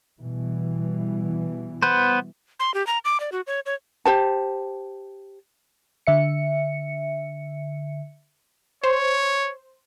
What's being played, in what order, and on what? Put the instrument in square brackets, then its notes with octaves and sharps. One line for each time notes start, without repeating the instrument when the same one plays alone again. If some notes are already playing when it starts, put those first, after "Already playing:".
[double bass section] B2 E3 G3
[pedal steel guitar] B3 B4 C5
[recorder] C6
G4
A#5
D6
D5
F#4
C#5
C#5
[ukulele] G4 C5 A5
[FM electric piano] D3 E5 C#7
[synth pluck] C5 [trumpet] C#5